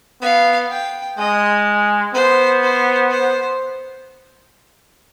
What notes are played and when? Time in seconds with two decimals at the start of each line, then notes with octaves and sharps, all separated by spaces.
0.22 B3 F5
0.71 G5
1.18 G#3 D#5
2.14 B3 C5
2.63 C5
3.11 C5